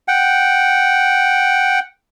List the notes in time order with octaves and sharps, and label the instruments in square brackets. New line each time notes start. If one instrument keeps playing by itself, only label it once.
[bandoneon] F#5 G5